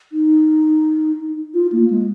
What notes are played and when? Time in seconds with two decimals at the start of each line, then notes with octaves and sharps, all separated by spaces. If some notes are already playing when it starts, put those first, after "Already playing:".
0.12 D#4
1.54 F4
1.72 A#3
1.90 G#3